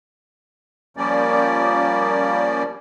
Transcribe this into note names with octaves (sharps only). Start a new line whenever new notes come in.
F3 G3 A#3 C#4 D5